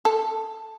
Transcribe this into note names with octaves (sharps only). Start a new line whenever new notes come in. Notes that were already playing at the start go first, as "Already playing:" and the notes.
A4